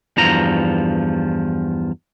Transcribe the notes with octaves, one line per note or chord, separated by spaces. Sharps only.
E2 G2 F3 A#5